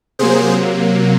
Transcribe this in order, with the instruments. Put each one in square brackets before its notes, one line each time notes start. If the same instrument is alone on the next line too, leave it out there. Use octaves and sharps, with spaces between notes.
[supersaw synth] C3 F#3 A#3 G#4 C5